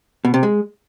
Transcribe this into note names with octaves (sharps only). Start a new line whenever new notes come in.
B2
C3
G#3